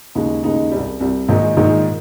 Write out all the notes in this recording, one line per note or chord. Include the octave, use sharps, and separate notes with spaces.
D#2 C#3 G#3 D#4
D#2 C#3 G#3 D#4
C2 C3 G3
C2 C3 G3
A#1 G#2 D#3 G#3 D#4
A#1 G#2 D#3 G#3 D#4